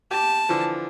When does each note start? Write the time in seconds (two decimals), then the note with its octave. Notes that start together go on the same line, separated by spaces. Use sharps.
0.11 G4 A5 D6
0.49 D3 E3 F3